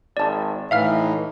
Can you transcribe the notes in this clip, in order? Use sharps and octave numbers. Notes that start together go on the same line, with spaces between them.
G#1 D5 A5
A2 E3 D#4 E5 F5 F6